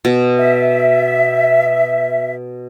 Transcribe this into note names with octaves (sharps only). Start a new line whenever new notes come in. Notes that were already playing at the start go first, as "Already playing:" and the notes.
B2
E5